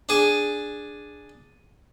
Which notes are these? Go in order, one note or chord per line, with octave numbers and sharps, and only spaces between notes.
D4 G#4